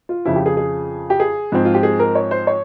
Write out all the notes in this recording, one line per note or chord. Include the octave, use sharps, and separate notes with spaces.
F4
F2 C#3 F3 E4
G4
G#4
G#4
G4
G#4
G#2 F3 C4
F4
G4
G#4
A#4
C#5
C5
C#5